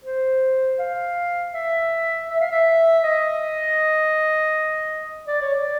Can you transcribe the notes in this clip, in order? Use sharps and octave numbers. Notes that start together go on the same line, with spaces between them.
C5
F5
E5
E5
F5
E5
D#5
D5
C#5
D5